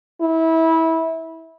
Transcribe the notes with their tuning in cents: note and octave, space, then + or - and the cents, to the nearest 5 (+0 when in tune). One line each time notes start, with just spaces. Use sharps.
E4 -25